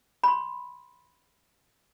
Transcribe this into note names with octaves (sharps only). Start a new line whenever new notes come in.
B5 C6